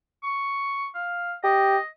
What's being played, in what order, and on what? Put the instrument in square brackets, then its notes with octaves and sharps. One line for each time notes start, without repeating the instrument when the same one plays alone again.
[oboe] C#6
F5
[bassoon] G4 [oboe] D#5